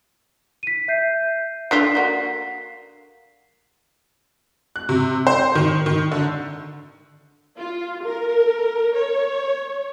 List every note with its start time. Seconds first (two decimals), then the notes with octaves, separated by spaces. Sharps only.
0.63 B6 D#7
0.88 E5 G6 C7
1.71 A3 D4 F4 F5 B6 C7
1.95 A#3 F#4
4.76 F#6
4.89 C3
5.27 C5
5.55 D#3
5.86 D#3
6.12 D3
7.57 F4
8.04 A#4
8.95 C#5